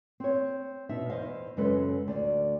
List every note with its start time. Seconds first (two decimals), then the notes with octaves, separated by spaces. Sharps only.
0.20 C4 C#5
0.89 B2 D#4 E5
1.10 E2 C5 D#5 F5
1.57 F#2 C#3 G#3 A4 B4
2.08 D2 D5